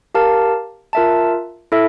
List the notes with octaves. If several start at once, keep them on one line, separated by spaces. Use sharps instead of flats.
G4 A#4 F5 A5
F4 A#4 E5 A5
E4 A4 E5